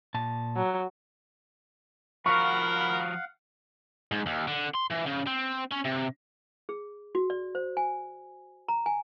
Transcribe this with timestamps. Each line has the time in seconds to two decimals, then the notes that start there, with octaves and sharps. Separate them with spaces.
0.14 A#2 A5
0.56 F#3
2.26 F3 F4 F#4 A#4 F5 F#5 B5 C#6
4.11 G#2
4.26 D#2
4.47 D3
4.74 C6
4.90 E3
5.06 C#3
5.27 C4
5.71 C#4
5.84 C3
6.69 G#4
7.15 F#4
7.30 D5
7.55 C5
7.77 G#5
8.68 A#5
8.86 G#5